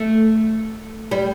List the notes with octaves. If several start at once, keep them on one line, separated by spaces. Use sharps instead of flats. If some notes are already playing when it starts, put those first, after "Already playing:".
Already playing: A3
G3